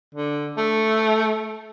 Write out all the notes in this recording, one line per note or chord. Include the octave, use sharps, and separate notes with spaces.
D3
A3